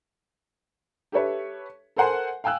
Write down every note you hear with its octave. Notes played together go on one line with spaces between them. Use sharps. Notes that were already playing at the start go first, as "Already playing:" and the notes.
G4 A4 B4 C#5 E5
A4 A#4 C5 F#5 G#5 C6
F5 G5 G#5 E6 F#6